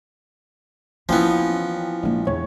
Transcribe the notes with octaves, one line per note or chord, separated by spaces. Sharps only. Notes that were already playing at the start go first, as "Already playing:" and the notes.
A1 F3 A#3 B3 E4 G5 G#5
A#1 G#3 A#3
E2 C#5